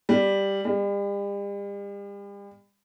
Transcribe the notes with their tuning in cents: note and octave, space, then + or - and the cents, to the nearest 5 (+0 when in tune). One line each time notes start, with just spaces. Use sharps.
G3 +5
G3 +40